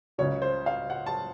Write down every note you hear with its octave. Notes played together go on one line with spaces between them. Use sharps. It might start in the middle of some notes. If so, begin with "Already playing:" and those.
C#2 C#3 F#3 C#5
C5
F5
F#5
A5